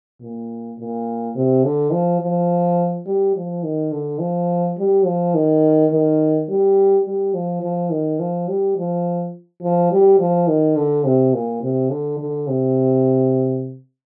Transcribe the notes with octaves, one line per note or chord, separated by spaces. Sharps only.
A#2
A#2
C3
D3
F3
F3
G3
F3
D#3
D3
F3
G3
F3
D#3
D#3
G3
G3
F3
F3
D#3
F3
G3
F3
F3
G3
F3
D#3
D3
C3
A#2
C3
D3
D3
C3